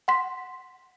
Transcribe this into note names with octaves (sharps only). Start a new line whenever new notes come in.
F#5 C6 B6